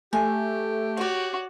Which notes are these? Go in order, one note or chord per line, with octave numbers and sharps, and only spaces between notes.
A3 G4 G#5
F#4 C#5 D5